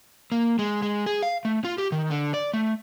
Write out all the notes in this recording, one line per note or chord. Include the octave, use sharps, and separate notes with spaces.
A#3
G#3
G#3
G#4
F5
A3
F4
G4
D#3
D3
D5
A3